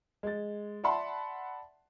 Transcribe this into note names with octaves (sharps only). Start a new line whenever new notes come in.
G#3 A6
D5 E5 F#5 A5 B5 C6